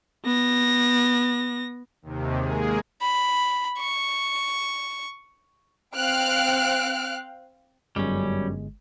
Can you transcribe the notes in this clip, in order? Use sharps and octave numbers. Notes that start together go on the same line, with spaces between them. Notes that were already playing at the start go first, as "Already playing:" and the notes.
B3 A#6
D#2 C3 D#3
G#3 A#3 G#4
B5
C#6
C4 F5 G5 F6 F#6 D7
G1 F#2 G3 G#3 C#4